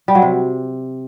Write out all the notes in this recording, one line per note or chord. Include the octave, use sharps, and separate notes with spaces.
G3
F#3
C3